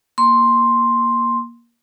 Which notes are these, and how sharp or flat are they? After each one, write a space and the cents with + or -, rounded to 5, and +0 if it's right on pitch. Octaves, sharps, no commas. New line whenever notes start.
A#3 +15 C6 +5